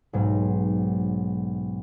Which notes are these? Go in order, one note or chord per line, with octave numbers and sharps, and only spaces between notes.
B1 G#2 F#3